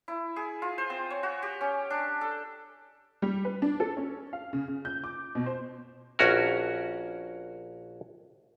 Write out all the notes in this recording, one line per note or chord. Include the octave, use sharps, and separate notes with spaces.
E4
G#4
F4
C5
C4
C#5
F#4
G4
C#4
D4
A4
G3
B4
D4
A4
C#4
F5
C#3
C#3
G6
D6
B2
C5
A#1 C#4 F#4 A#4